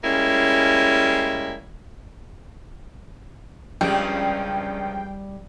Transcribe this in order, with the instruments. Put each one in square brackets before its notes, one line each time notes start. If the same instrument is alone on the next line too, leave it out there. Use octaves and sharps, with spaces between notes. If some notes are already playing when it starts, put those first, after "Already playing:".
[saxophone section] G3 G#3 A#3 C#4 E4
[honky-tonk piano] C#2 [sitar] C#3 F3 D4 [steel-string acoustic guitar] G3 [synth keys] G5